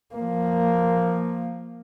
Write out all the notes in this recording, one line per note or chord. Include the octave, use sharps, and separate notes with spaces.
F3 A#3